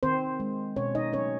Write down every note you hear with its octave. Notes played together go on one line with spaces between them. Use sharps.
D#3 C4 C5
G#3
B2 C#4 C#5
D#4 D#5
F#3 A3 C#4 C#5